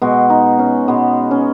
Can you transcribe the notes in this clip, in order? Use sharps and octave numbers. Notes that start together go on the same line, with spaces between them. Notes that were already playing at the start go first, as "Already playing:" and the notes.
B2 G#3 F#4
D#4
C#4
B2 G#3 B3
C#4